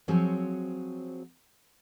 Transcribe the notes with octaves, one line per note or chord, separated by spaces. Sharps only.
F3 F#3 C4 F#4 G#4 C#5